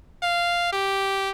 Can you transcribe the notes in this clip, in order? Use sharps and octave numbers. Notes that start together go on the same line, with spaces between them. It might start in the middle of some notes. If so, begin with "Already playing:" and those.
F5
G4